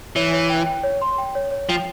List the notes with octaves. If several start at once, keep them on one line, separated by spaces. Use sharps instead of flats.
E3 C#5
C#5
G5
G5
C#5
C6
G5
C#5
C#5
F3 G5